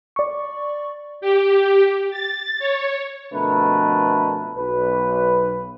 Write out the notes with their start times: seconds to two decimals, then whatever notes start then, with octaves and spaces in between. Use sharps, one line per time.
0.16 D5 C#6
1.21 G4
2.11 A6
2.59 C#5
3.32 F2 B2 D3 A3 A#4 B4
4.56 B1 B4